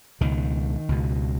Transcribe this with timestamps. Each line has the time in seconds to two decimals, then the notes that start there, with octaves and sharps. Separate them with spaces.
0.21 C#2 B2 D#3
0.89 C#2 B2